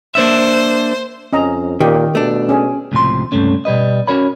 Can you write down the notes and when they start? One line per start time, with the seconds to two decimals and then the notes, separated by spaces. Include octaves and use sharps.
0.15 A#3 D4 C5 E5
1.33 F2 C#4 D#5 A#5
1.80 A#2 D#3 G4
2.15 B2 A3 D4
2.49 C#4 G#4
2.92 C#2 A2 C3 F3 C6
3.32 C#2 G2 C3 A3 C#4
3.65 B2 G3 B4 D#5
4.07 C#4 F#4 A#4 C#5 B5